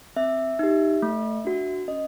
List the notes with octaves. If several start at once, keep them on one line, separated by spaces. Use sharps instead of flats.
C4 E5
D#4 G4
A3
D4 F#4
C#4 D#5